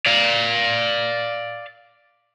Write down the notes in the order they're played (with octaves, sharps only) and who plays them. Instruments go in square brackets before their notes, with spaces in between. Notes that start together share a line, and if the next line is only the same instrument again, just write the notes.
[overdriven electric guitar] D5 F5